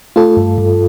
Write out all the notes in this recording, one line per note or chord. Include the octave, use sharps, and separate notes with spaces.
A3 F4 A4
G2
G2